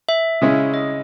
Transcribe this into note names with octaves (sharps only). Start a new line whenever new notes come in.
E5
C#3 G#3 C#4 E4
D#5